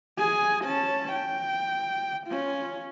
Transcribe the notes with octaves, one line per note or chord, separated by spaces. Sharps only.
G#4 G#5
C#4 A5
G5
C#4 F4